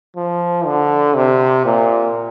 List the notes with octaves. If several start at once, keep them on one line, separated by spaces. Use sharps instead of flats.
F3
D3
C3
A#2